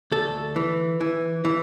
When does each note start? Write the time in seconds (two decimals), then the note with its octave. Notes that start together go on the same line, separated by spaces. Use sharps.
0.12 D2 A4
0.56 E3
1.01 E3
1.45 E3